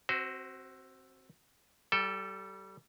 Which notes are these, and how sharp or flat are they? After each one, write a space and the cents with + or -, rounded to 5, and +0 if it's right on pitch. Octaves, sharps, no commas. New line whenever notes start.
C4 +15 F#4 +20 C5 -35
G3 -25 A4 +0 G5 +20